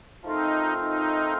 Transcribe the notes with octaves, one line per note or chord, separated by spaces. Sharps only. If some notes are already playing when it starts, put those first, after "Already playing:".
F3 A3 C4 D#4 F4 A#4
D#4